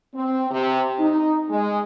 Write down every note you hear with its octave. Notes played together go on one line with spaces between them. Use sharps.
C4
C3
D#4
G#3